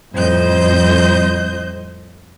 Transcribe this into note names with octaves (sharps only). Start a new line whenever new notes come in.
F2 A2 G3 C5 D#5 G6